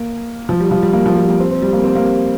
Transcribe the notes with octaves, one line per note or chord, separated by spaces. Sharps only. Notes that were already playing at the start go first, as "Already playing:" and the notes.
Already playing: A#3
F3
G3
F3
G3
A#3
F3
G3
A#3
C4
C4
G3
A#3
C4
A#3